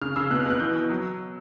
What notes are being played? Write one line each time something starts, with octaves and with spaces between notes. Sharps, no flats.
C#3 F6
C#3 E6
B2 F#6
F6
B2 F#6
E3 G6
E3
F#3